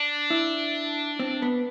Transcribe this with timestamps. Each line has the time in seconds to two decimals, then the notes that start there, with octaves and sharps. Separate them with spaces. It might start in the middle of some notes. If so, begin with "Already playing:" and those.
Already playing: D4
0.30 E4
1.19 C4
1.42 B3